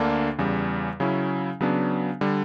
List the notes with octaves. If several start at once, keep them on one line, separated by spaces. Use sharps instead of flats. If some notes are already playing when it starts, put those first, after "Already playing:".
Already playing: D2 D3 A#3 D4
E2 C#3 G3
C#3 F#3 C#4 E4
C#3 F#3 B3 D4
D3 G3